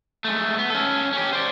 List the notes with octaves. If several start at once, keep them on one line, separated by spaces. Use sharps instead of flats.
G#3 A3
B3
C#4 A4
C#4 G4
C5 D5